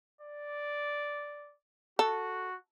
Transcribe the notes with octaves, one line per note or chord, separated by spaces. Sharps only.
D5
F#4 A4